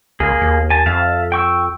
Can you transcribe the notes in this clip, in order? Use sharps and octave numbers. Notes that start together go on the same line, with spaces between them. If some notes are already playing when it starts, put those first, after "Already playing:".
C#2 A#3 G#4
D#2
G#5 A5
F2 E5 F5 A5
G5 C#6 E6